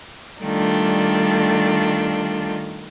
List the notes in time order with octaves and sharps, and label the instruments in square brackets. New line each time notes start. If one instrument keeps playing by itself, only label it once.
[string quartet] D#3 G3 A3 D4 F4